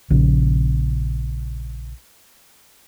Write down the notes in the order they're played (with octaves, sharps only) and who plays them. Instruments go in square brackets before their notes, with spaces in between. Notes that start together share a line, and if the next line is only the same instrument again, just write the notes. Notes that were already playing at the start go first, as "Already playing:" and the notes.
[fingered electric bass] A#1 C#3